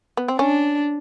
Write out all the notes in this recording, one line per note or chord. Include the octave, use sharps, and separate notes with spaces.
B3
C4
C#4 D4